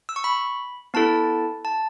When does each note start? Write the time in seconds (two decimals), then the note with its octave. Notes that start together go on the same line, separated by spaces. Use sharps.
0.09 E6
0.16 C#6
0.24 B5
0.94 B3 E4 A4 A5
1.65 A5